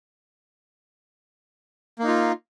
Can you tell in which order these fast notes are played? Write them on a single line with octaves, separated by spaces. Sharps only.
A#3 D#4 F4